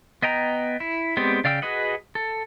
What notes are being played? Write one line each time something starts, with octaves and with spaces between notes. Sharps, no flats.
B3 D#5 G5 A#5
E4
G#3 B3 C4 G4 D5
C#3 D5 F5 G5 E6
F#4 G#4 B4 D#5 F#5
A4